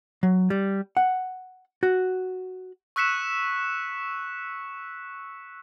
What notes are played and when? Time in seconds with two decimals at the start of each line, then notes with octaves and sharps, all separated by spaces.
0.23 F#3
0.50 G3
0.97 F#5
1.83 F#4
2.96 C#6 E6 F#6 B6 C#7 E7